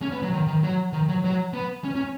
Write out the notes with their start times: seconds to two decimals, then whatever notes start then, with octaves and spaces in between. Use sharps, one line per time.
0.02 C#4
0.12 B3
0.22 F#3
0.33 D#3
0.47 D#3
0.63 F#3
0.93 D#3
1.08 F#3
1.24 F#3
1.54 B3
1.84 C#4
1.95 C#4